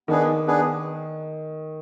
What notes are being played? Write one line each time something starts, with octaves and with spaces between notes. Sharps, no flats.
D#3 B3 D4 G#4 B4
B3 D4 G#4 B4